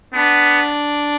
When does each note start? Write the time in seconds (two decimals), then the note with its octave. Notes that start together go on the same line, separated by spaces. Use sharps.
0.14 B3 D4